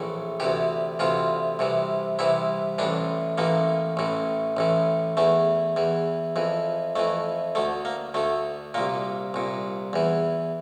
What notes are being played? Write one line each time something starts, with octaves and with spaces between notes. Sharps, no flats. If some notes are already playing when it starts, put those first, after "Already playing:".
Already playing: A#1 A2 E3
D2 C3 E3 G4
D2 C3 E3 F4
C2 C3 E3
C2 C3 E3 E4
A1 A2 E3 D4
A1 A2 E3 A#3
A1 A2 E3
A1 A2 E3
E2 E3 A3
E2 E3
F2 E3
F2 E3 A3
D2 D3 A3
A#3
D2 D3 A3
C2 A#2 A#3
C2 A#2
E2 E3